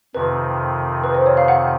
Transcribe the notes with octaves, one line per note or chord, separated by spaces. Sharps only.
F2 C3 D#3 B4
B4
C5
C#5
F5
F#5